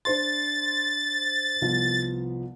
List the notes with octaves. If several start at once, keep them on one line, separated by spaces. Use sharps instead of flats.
D4 C5 C6 A6
C2 F3 B3